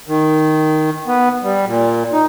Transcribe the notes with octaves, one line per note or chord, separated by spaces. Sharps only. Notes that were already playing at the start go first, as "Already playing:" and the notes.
D#3
B3
G3
A#2
D#4